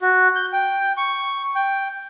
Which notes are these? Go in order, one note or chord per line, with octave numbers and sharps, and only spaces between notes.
F#4
G6
G5
C#6
G5